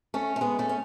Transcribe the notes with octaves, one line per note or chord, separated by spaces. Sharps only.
A3 C#4
A3
G#3 B3
A3 C#4
C#4